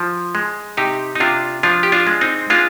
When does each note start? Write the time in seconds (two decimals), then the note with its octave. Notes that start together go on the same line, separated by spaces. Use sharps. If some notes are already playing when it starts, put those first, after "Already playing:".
Already playing: F3
0.35 G#3
0.77 C3 D#4 G4
1.15 D#4
1.20 C3 D4 F4
1.63 F3 D4 F4
1.83 G4
1.92 D4 F4
2.07 G#3
2.21 C4 D#4
2.50 G#3 D4 F4